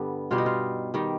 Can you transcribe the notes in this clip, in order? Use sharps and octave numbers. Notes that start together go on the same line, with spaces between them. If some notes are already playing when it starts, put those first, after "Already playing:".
Already playing: G2 D3 G3 B3
B2 G3 F4
D#4
F4
D#3 G3